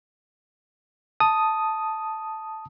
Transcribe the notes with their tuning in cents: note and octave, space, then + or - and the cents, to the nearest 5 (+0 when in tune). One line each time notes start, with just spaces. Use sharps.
A5 +0 D#6 +0